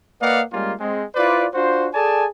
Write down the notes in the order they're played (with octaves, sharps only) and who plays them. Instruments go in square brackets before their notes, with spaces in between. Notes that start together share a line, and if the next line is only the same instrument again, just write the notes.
[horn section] A#3 B4 D5 D#5 F5 F#5
G3 G#3 A#3 C#4 F4
G#3 C4
E4 F4 B4 C5 D5
D4 F4 F#4 C5
G#4 A4 D5 G#5 A5